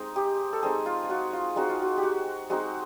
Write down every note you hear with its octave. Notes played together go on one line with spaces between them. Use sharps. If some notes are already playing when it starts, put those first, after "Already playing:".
Already playing: G#3 C4 D#4
G4
A4
G#3 C4 D#4 G#4
F4
F4
F#4
F4
G#3 C4 D#4 F#4
F4
F#4
G4
F#4
G#3 C4 D#4 F#4